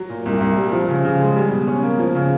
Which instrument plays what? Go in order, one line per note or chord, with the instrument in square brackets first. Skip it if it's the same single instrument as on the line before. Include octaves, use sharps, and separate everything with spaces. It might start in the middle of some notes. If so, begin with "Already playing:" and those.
Already playing: [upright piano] F#3
A#2
C2
C2
G3
F3
C#3
C#3
G#3
G3
B2
C#4
A#3
F3
C#3